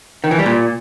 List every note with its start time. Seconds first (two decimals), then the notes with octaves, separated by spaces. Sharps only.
0.24 D#3
0.31 E3
0.38 G3
0.46 A#2